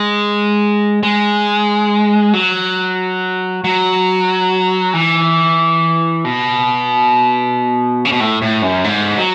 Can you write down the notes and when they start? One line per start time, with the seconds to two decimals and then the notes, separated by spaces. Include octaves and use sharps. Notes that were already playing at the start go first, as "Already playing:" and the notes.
Already playing: G#3
1.03 G#3
2.33 F#3
3.64 F#3
4.94 E3
6.25 B2
8.05 C#3
8.12 B2
8.20 A2
8.42 A2
8.62 F#2
8.84 G#2
9.17 F#3